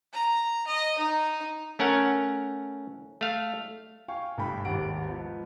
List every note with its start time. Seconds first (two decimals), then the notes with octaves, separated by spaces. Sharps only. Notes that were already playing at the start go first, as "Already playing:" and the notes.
0.13 A#5
0.68 D#5
0.98 D#4
1.79 A3 C#4 A#4 F#5
3.21 A3 F5
4.08 F5 G5 G#5 C#6
4.37 G1 G2 A3 G5 B5
4.65 G#1 D#2 G4 F#5 D7
5.07 G#2 F3 B3